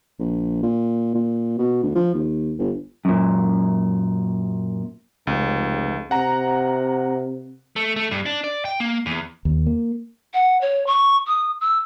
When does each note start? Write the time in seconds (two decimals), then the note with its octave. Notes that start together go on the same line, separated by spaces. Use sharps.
0.19 A#1
0.63 A#2
1.14 A#2
1.59 B2
1.83 D2
1.95 F3
2.14 D#2
2.59 G1
3.05 F#2 A#2
5.27 F1 C#2
6.11 C3 F#5 A#5
7.76 A3
7.96 A3
8.11 G2
8.26 D4
8.44 D5
8.65 G5
8.80 A#3
9.06 E2
9.45 D#2
9.67 A#3
10.34 F#5
10.61 C#5
10.87 C#6
11.27 D#6
11.61 E6